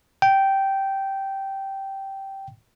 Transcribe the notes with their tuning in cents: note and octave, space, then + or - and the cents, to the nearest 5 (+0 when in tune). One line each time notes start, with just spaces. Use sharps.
G5 -10